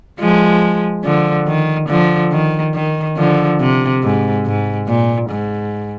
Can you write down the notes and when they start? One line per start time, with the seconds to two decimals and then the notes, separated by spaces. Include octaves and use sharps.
0.19 F3 G#3
1.04 D3 F3
1.47 D#3
1.89 D3 F3
2.32 D#3
2.74 D#3
3.17 D3 F3
3.60 C3
4.03 G#2
4.46 G#2
4.88 A#2
5.30 G#2